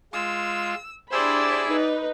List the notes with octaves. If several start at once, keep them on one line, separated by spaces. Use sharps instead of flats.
G#3 F4 E6
D4 E4 G4 G#4 C5 D5 B5 E6
D#4 B4